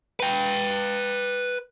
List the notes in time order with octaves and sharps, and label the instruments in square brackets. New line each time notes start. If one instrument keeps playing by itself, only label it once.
[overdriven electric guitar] B4 G5